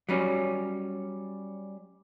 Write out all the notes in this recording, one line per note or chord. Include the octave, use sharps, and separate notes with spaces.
F#3 G3 C#4